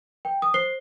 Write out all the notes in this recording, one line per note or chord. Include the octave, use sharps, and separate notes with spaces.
G5
D#6
C5 C7 G7